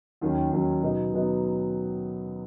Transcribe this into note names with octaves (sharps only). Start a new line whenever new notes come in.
D#2 D#3 F#3 C#4
D#2 D#3 F#3 C#4
B2 F#3 B3 D#4
B2 F#3 B3 D#4